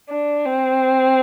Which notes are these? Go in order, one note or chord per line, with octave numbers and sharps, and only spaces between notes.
D4
C4